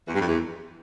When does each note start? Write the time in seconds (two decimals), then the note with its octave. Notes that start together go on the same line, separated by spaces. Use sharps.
0.07 E2
0.14 G2
0.20 F2
0.27 E2